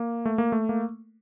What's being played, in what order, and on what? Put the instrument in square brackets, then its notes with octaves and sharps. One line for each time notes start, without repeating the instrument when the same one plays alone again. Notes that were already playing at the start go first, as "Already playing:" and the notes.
Already playing: [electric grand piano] A#3
A3
A#3
A3
A#3